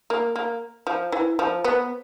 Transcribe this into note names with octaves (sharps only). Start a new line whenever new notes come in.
A#3
A#3
F3
E3
F3
B3